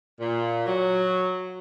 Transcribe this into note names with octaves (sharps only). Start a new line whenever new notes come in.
A#2
F#3